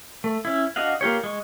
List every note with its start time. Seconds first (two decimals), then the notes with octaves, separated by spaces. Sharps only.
0.24 A3
0.45 C#4 E4
0.76 D4 F#4 D#5 F5 F#5
1.01 A#3 F4 G4 C#5
1.24 G#3 C#6